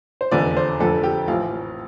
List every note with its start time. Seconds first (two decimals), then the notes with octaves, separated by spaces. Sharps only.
0.21 C5
0.31 F1 E2 D3 F3 D5
0.57 C5
0.80 F1 F2 D3 F3 A4
1.03 G4
1.27 A1 A2 F3 F4